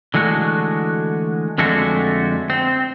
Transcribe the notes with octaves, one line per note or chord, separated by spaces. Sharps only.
D3 E3 G#3 A3 F#4
F2 D3 G#3 A3 F#4
C4